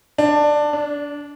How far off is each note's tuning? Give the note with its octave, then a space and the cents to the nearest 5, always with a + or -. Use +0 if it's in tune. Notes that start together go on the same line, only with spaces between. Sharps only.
D4 +10
D4 -20